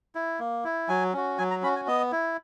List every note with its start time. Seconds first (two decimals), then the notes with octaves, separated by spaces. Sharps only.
0.15 E4
0.40 A#3
0.64 E4
0.89 F#3 G#5
1.13 C#4 F#4
1.38 F#3 G#5
1.51 A#5
1.63 C#4 F#4 B5
1.76 G#5
1.87 B3 D#5
2.12 E4